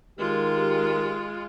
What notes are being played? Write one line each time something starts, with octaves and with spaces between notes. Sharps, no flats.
D#3 G#3 F4 G4 A#4